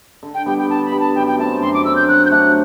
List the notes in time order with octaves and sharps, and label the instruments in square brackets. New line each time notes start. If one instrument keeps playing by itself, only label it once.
[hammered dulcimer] D3
[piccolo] G5
[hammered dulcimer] G3 B3 [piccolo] G5
[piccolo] G5
[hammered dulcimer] D3 [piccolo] A5
[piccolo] B5
[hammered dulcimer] G3 B3
[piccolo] A5
[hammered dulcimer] F#2 [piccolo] G5
[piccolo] G5
[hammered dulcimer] D3 A3 C4 [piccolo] A5
[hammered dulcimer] F#2 [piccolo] C6
[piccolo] D6
[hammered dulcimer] D3 A3 C4 [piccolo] E6
[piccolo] G6
[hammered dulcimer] F#3 [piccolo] F#6
[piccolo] G6
[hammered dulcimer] A3 D4 F#4 [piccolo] F#6